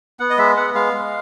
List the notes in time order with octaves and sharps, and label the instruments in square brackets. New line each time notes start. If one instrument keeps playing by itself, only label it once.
[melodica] B3 F#5
D#5
G#3 E5
B3 F#5
G#3 F5
G#3